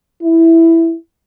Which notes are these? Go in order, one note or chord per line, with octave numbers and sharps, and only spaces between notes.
E4